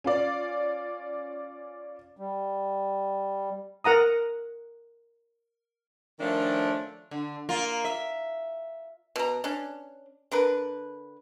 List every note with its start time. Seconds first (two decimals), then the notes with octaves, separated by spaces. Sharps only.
0.04 C#4 F4 D5
2.17 G3
3.84 A#4 F#5 A#5 D#6
6.19 D#3 F3 A3 C#4 D4 F4
7.11 D3
7.49 A#3 F4
7.84 E5
9.16 B2 A#5
9.44 C#4 D4
10.31 D3 A#4 B4